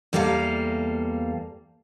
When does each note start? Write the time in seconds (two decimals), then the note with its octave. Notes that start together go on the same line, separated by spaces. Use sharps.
0.13 E2 G3 A#3 A4 B4 F5